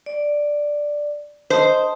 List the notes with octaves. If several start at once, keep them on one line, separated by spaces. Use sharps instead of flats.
D5
C5 D#5 A5 D#6